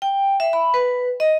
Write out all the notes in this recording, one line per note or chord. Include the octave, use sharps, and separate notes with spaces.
G5
E5
B5
B4
D#5